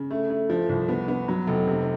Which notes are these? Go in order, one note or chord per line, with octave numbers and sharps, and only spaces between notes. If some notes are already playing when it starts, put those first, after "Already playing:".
Already playing: C#3
A3
A3
F3
C2
B3
B3
F#3
F1
C3